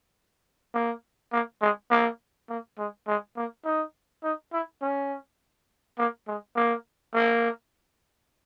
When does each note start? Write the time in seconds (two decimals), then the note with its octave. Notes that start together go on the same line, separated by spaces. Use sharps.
0.74 A#3
1.33 A#3
1.61 G#3
1.91 A#3
2.49 A#3
2.78 G#3
3.07 G#3
3.37 A#3
3.65 D#4
4.23 D#4
4.53 E4
4.82 C#4
5.98 A#3
6.27 G#3
6.56 A#3
7.14 A#3